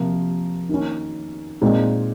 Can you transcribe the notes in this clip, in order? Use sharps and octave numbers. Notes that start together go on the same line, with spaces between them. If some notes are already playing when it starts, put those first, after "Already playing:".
Already playing: C3 F3 A#3 A#4
D#3 A#3 C#4
A#2 G#3 C4 D#4